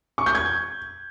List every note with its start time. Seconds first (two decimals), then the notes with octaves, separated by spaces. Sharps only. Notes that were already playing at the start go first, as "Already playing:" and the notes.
0.18 C#6
0.26 G6
0.35 G#6